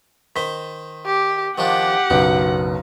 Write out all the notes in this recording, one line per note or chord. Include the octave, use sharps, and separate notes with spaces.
D#3 C5 B6
G4
D#3 F3 D4 G4 F#5
F#1 B1 B3